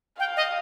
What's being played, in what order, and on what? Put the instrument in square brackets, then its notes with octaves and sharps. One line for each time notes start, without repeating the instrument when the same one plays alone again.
[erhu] F5 [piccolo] G5
[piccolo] D#5